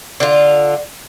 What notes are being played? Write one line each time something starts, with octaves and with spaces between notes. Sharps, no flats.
D3 F4